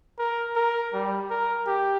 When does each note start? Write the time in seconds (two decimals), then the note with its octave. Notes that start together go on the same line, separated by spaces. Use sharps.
0.19 A#4
0.56 A#4
0.94 G3
1.31 A#4
1.67 G4